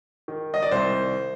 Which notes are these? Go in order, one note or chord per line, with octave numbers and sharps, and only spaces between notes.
D#3
D#5
D5
C2 C5